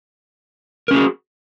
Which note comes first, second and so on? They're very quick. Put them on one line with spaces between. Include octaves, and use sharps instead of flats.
A#4 C#4 G#4 F#4